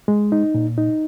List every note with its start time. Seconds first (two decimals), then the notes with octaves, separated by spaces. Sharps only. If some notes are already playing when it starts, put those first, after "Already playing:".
0.08 G#3
0.32 D#4
0.55 A#2
0.78 D#4